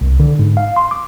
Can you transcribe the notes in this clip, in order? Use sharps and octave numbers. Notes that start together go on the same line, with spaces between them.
C2
D3
G#2
F5
C6
D6